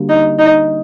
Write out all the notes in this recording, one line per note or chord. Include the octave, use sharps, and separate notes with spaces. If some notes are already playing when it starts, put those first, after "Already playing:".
Already playing: D3 G3 A#3 F#4
D#4
D#4